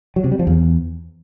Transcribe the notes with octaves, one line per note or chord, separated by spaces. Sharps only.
F#3
C3
G3
F3
E2